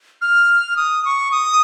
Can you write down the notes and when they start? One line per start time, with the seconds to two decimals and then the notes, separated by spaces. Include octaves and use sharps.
0.22 F6
0.77 D#6
1.05 C#6
1.32 D#6